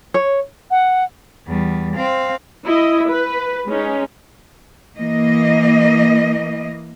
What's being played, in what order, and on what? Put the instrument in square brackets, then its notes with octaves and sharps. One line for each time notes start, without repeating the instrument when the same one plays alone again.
[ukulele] C#5
[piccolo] F#5
[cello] E2 G3
C4 F5
[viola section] E4 D#5
B4
G#3 C#4 D#4
[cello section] E3 A#3 D#5